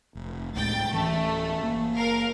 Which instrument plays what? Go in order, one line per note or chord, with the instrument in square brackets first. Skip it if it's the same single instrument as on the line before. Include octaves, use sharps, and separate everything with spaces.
[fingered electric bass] F1
[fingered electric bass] C#2 A2 G#3 [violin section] G5 A6
[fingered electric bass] D1 E3 C#4 [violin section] A3
[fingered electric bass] F#1 A#3
[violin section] A#4 F5